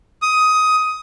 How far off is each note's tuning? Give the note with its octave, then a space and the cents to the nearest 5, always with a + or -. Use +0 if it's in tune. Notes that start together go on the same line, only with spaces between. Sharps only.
D#6 +15